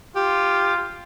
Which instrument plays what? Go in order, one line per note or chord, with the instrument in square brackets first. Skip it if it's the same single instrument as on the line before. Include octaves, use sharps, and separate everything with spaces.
[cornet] F4 [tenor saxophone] G4